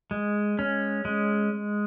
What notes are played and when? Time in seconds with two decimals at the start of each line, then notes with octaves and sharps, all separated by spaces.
0.11 G#3
0.59 C#4
1.05 G#3